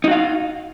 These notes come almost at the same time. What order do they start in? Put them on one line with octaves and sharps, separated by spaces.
D#4 F#4 F5